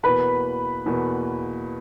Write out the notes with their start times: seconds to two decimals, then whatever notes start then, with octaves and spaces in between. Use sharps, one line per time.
0.03 E2 B2 A#3 B4 B5
0.86 E2 B2 A#3